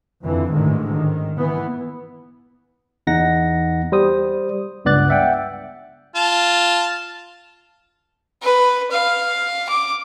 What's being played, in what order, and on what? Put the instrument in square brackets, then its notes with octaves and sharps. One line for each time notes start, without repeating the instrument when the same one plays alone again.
[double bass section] F2 D3 E3
A1 G#2 D3 D#3 G#3
D#3
E3 B3
[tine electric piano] E2 D#4 F#5 A#6
G3 C5 D#6
C#2 G2 B3 D5 F#6 A6
E5 F#5 G5
[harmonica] F4 A5
[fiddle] B4
F5
D6